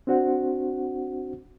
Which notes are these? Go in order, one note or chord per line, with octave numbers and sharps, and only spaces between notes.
C4 D4 F#4 C5 F#5